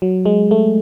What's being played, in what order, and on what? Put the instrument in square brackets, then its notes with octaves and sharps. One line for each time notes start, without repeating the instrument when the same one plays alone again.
[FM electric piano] F#3
G#3
A3